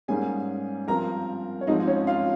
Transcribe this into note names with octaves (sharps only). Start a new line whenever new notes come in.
G#2 G3 A#3 C#4 G#4 G#5
G2 F3 C4 A#4 A#5
C#5
G#2 F3 G#3 C4 D#4 D#5
C#4 C#5
F4 F5